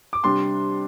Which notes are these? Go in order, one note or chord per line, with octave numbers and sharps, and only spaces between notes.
D6
C3 G3 D4 C6